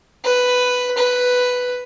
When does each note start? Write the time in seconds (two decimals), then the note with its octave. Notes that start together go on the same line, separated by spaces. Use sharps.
0.24 B4
0.98 B4